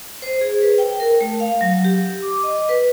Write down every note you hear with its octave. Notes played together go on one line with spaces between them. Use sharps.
C5
G#4
B4
G5
A#4
A3
F5
F#3
G4
D6
D#5
B4